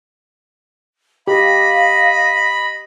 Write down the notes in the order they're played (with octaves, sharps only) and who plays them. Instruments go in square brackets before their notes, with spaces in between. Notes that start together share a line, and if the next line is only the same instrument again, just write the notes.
[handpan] G4 [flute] D#5 [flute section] F5 [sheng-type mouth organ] B5